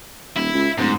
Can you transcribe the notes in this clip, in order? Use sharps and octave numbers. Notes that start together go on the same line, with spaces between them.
D#1 E4
C#2
D1 G#2